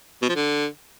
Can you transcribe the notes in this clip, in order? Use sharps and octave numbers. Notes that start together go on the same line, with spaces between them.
B2
F3
D3